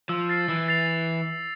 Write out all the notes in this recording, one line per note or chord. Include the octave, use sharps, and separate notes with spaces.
F3 E6
A6 C7
E3 E6
A6 C7 F7